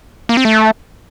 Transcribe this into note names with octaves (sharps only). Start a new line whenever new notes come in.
A#3
C4
A3